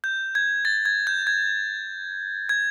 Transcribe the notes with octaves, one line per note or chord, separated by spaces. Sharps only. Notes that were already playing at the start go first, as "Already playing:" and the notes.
G6
G#6
A6
G#6
G6
G#6
G#6